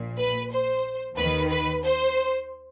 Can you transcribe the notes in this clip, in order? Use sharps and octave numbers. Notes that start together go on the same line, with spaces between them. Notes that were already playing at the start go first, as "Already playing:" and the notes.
Already playing: A#1 A#2
B4
C5
D#2 D#3 B4
B4
C5